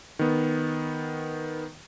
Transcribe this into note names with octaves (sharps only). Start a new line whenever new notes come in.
D#3 B3